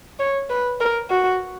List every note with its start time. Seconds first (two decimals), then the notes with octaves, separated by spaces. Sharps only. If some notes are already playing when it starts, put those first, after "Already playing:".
0.19 C#5
0.50 B4
0.80 A#4
1.10 F#4